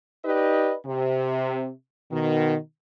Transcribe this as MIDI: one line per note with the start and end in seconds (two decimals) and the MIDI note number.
0.24 0.74 63
0.24 0.74 67
0.24 0.74 71
0.24 0.74 74
0.24 0.74 75
0.86 1.69 48
2.12 2.56 47
2.12 2.56 51